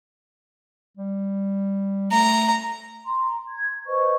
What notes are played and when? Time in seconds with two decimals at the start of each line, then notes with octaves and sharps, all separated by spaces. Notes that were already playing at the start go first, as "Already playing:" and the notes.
0.98 G3
2.12 A3 A#5
3.05 A#5 C6
3.48 G#6
3.86 B4 C5 D#5 C#6